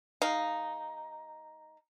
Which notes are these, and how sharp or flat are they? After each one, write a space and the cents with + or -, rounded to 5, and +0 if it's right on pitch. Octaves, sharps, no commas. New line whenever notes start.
G#3 +25 D#4 +0 F5 +0